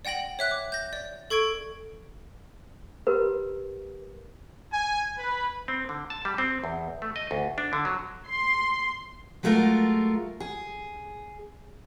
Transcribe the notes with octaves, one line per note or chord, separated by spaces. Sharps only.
D5 F#5 G5 A#6 F#7
C#5 E5 F#6
D6
G6 A#6
D5
A4 C#6 G#6 D7
G4 A#4 B4
G#5
B4
C4
D3
A5
G3
C4
E2
A3
D#5
D2
D4
D3
F#3
C6
F#3 G#3 A3 F4 A#4
G#4